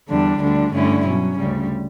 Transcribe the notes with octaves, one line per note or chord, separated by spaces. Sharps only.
E2 D3 G3 D4
D2 D3 G3 D4
G2 D3 A3 C#4 E4
B2 F#3 C#4
D2 C#3 G3